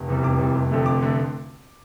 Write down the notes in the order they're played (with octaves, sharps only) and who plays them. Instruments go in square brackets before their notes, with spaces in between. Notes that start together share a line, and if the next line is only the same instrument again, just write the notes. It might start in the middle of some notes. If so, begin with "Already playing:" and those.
Already playing: [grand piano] F1
E2 C3 G3
F1 D6
E2 C3 G3
F1
F2 D3 A3
F1 D6
D3 A3